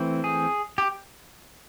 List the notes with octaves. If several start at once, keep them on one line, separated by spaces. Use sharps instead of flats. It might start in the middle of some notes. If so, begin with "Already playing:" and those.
Already playing: E3 A3 C4
G#4
G4